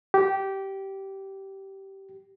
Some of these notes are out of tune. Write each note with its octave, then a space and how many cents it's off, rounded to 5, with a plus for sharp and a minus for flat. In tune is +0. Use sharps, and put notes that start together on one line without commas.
G4 -15